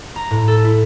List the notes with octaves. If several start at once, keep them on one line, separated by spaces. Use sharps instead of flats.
A#5
A2
A4
E4